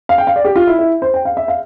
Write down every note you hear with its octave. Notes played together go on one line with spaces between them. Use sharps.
F5
G5
F5
D5
G4
F4
E4
E4
C5
G5
F5
E5
F5